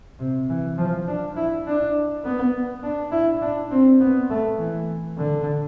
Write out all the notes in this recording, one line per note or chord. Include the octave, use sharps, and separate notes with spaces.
C3
E3
F3
D4
E4
D4
B3
D4
E4
D4
C4
B3
A3
E3
D3